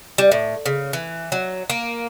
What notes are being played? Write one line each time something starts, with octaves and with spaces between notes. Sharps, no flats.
G3
A2
C#3
E3
F#3
A#3